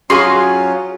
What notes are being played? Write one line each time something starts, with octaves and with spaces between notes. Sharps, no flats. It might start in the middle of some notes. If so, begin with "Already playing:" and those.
F#3 C#4 F4 F#4 G#4 F5 C6